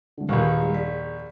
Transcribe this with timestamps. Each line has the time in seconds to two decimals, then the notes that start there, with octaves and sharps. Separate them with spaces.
0.18 C2 D3
0.29 A#1 D#2 B4 C#6 D#6
0.60 D#3 G3 G#4
0.74 G#4 D5 B6